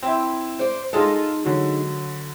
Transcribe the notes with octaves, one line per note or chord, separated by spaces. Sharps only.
C4 E4
C5 D5
G#3 D#4 F4 G#4 A4
D3 F#3